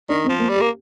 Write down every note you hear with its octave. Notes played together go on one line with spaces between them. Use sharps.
D#3 D4
C4
F3
A#3
G3
G4
A#3